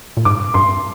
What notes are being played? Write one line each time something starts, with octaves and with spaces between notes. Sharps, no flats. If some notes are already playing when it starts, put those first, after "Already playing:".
A#2
G#2 D6
G2 C6